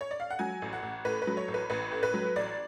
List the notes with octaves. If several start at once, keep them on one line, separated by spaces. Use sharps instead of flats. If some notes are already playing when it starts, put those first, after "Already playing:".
C#5
D5
F5
F#5
F#3 G#5
A1
F#5
A1
A2 B4
B4
F#3
C#5
A1
B4
A1 B4
A2
B4
F#3
A1 D5